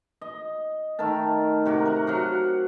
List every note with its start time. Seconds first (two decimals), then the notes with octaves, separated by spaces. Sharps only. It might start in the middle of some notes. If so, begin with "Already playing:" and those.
0.21 D#5
0.99 D#3 A3 A#4 A5
1.66 C3 F#4 A#4 D6
1.85 A#4 F#5
2.07 F#3 F5 F#5